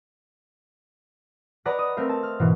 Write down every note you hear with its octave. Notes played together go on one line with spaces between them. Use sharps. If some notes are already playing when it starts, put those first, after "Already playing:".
B4 D5 D#5 F#5 A#5
D#6
A3 C4 A#4 F5
A5
F6
G#2 B2 E3 A#3